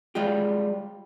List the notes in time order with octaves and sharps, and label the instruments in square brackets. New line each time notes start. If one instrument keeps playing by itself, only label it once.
[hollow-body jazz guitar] G3 G#3 F4 G4